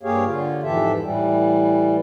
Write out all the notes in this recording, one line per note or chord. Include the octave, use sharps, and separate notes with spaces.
G2 A#3 G4 G#4 C#5 F5
D3 F4
F2 G#2 E3 G4 A4 E5
A2 E3 G3